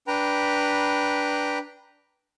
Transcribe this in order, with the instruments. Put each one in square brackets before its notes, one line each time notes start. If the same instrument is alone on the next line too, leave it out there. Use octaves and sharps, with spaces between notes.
[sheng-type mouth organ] D4 B4 G5 A#5 B5